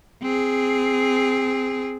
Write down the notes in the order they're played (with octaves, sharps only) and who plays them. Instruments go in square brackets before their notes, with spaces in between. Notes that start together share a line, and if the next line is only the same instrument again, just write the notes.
[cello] C4 G#4